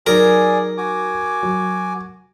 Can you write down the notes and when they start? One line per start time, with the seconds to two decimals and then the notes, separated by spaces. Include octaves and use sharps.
0.07 F#3 D#4 G#4 A#4 D5 G#5
0.78 F#4 G#5 D6
1.43 F#3